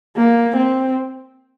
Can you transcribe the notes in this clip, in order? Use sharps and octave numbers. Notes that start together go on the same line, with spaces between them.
A#3
C4